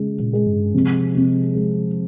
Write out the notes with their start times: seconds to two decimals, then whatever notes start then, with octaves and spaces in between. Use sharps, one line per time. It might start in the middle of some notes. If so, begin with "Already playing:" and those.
Already playing: C#3 G#3
0.20 A#2
0.33 G#3
0.47 G2
0.74 C3 F3
1.15 C3
1.54 G#3